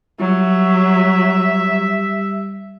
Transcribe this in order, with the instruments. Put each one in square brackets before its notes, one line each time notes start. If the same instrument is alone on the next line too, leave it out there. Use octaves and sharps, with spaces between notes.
[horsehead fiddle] F#3 [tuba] G3 [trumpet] E5